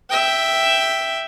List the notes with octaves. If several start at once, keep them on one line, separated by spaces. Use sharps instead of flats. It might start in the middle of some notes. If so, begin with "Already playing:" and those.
E5 G5